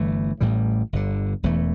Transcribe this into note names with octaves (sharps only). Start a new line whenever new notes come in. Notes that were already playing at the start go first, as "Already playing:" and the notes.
Already playing: G1 G2 E3 A3
A1 A2 E3 G3
G1 G2 D3
E1 E2 E3 A3